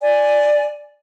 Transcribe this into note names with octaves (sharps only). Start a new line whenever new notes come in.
D5 G#5